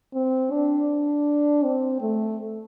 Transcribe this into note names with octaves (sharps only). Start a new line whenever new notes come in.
C4
D4
C4
A3